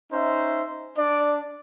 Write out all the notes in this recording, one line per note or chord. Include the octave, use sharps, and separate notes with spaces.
C#4 D#4 C5 E5
D4 D5